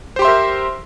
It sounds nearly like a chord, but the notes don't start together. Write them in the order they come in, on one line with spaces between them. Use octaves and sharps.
C5 G4 C6 E5 A#4